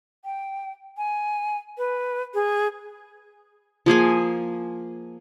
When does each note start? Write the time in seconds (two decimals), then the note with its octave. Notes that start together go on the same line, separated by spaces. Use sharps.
0.25 G5
0.97 G#5
1.78 B4
2.34 G#4
3.86 F3 A#3 G#4 G#5